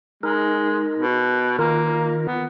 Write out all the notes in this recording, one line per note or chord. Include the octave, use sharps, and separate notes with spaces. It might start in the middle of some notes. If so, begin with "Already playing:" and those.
G#3 D#4 A#4
B2
D#3 A#3 F4 A#4
B3